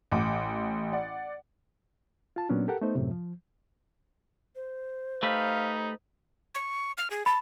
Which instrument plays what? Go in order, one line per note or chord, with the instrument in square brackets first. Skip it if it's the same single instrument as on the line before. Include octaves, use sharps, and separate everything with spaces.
[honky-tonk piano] A1 F#5 D6
D5 F#5
[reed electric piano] F4 A5
A#2 F#3 B3 C#4 D4
G4 A4 A#4 F#5
A3 B3 D#4 C5
F#2 A2 C3
F3
[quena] C5
[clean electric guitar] A3 G4 B4 [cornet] D#4 [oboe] F5
[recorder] C#6
F6
G#4
[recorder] A5 [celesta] B5